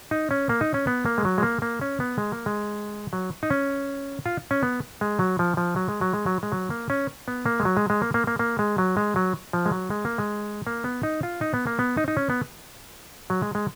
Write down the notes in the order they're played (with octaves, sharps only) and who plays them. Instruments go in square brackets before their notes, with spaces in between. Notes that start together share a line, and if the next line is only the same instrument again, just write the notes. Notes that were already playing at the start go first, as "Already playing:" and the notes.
[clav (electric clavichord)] D#4
C#4
A#3
D#4
C#4
B3
A#3
G#3
F#3
G#3
A#3
A#3
C#4
B3
G#3
A#3
G#3
F#3
D#4
C#4
F4
C#4
B3
G#3
F#3
F3
F3
F#3
G#3
F#3
G#3
F#3
G#3
F#3
A#3
C#4
B3
A#3
G#3
F#3
G#3
G#3
A#3
A#3
A#3
A#3
G#3
F#3
G#3
F#3
F3
G#3
F#3
G#3
A#3
G#3
A#3
B3
D#4
F4
D#4
B3
A#3
B3
D#4
D#4
C#4
B3
F#3
G#3
G#3